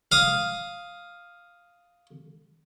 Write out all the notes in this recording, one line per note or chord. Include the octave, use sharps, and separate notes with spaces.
F5 D#6